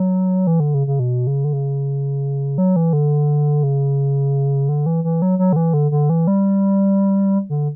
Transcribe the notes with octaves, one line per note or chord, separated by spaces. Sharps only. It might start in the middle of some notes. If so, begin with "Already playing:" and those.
Already playing: F#3
E3
D3
C#3
C#3
B2
C#3
D3
C#3
F#3
E3
D3
C#3
D3
E3
E3
F#3
F#3
D3
E3
D3
D3
E3
G3
D3